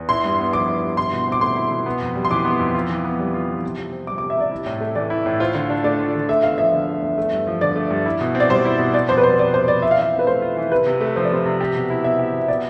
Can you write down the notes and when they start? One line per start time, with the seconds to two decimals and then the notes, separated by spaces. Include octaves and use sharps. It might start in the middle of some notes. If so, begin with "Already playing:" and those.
Already playing: E2
0.09 E4 C6
0.24 G2
0.39 B3
0.53 F3 D6
0.68 E4
0.83 G2
0.97 E4 C6
1.13 B2
1.27 C4 D6
1.41 A3 C6
1.56 E4
1.71 B2
1.86 B3
2.01 F2
2.16 G3
2.25 C6
2.31 E3 D6
2.45 B3
2.59 F2
2.74 F4
2.89 E3
3.04 B3
3.19 G3
3.34 F4
3.49 E3
3.64 C3
3.77 C3
3.92 C4
4.07 G3 D6
4.18 D6
4.22 C3
4.30 E5
4.37 C3 D5
4.51 E4
4.66 A2
4.81 A3
4.95 E3 D5
5.10 E4
5.26 A2
5.40 F4 C5
5.55 D3
5.70 D4
5.84 A3 D5
6.00 F4
6.15 D3
6.28 A3 E5
6.43 E2 F5
6.58 F3 E5
6.74 D3
6.88 A3
7.02 E2
7.18 A3
7.32 G2
7.47 F3
7.61 D3 D5
7.76 A3
7.91 G2
8.06 E4
8.21 B2
8.35 C4
8.40 D5
8.49 G3 C5
8.65 E4
8.79 B2
8.94 B3 D5
9.09 F2 C5
9.17 B4
9.23 G3 C5
9.39 C3 D5
9.54 B3 C5
9.68 F2 D5
9.82 F4 E5
9.91 F5
9.97 E3 E5
10.13 C4
10.19 B4
10.27 A3 C5
10.42 F4
10.57 E3
10.72 C3 B4
10.86 C3
11.01 A3
11.16 F3 C5
11.24 D5
11.31 C3 C5
11.45 C3
11.61 G4
11.75 B2
11.90 E4
12.04 B3 E5
12.19 G4
12.33 B2
12.48 B3 D5